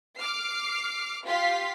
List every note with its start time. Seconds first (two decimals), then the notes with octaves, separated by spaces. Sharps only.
0.18 D6 F6 C7
1.24 F4 G4 F5 C6 B6